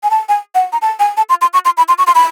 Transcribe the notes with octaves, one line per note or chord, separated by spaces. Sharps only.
G#5
A5
G#5
F#5
A#5
A5
G#5
A5
C6
C6
C#6
C6
B5
C6
C#6
C6
B5